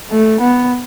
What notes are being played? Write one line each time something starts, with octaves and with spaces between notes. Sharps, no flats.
A3
B3